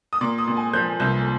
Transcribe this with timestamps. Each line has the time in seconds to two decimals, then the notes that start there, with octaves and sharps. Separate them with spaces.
0.13 D#6
0.21 A#2 D6
0.38 D#6
0.47 A#2
0.57 G#5
0.73 F3 G6
1.00 C2 G6